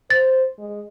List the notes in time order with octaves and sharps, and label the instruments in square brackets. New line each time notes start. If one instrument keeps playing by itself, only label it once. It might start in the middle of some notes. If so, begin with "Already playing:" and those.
[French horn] C5 [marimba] A6
[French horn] G#3